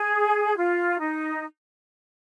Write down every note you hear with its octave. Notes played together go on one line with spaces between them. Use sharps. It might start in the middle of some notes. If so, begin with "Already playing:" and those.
Already playing: G#4
F4
D#4